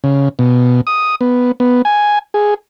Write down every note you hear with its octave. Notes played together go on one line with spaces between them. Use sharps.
C#3
B2
D#6
B3
B3
G#5
G#4